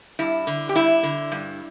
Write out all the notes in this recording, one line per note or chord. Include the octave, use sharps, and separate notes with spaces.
G2 E4
D3
G4
G2 E4
D3
G2